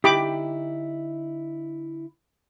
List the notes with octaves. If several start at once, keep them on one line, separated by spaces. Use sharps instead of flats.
D3 D#4 E4 G4 B5 D6